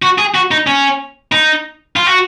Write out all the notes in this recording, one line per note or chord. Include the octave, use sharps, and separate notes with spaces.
F#4
G#4
F#4
D#4
C#4
D#4
F4
F#4